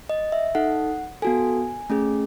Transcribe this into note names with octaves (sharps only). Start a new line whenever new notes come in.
D#5
E5
D#4 A4 F#5
B3 F#4 A4 G#5
A3 C#4 G#4